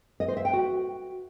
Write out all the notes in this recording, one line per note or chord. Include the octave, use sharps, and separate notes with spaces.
D#5
C5
E5
G5
F#4